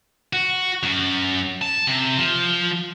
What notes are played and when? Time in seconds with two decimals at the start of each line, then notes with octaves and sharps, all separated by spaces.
0.33 F#4
0.83 F#2
1.62 A5
1.87 C3
2.18 F3